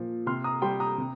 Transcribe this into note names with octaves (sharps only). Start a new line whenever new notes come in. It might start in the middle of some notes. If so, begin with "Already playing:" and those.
Already playing: A#2 F3
C3 C6 F6
A#5 D#6
G3 G5 C6
A#5 D#6
C3